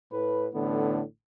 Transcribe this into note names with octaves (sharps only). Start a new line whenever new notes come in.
A2 B4
A1 A2 D3 B3